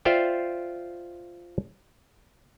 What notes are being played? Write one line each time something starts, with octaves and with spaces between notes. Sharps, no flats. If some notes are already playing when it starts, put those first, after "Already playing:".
F4 C5 D5 E5 F5 G5